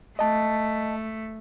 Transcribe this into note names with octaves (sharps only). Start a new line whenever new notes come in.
A3 D#5 A5